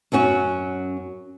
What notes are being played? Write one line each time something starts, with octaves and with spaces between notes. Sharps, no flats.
F#2 F#3 C#4 F#4